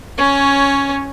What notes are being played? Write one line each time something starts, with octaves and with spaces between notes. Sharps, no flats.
C#4 C#5